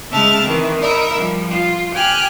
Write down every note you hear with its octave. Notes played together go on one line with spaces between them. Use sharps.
C#3 G#3 E5 A5 F6
D#3 E3 C4
D#4 A#4 E5 B5
F3 G3
F4
G4 G5 G#5 F6 F#6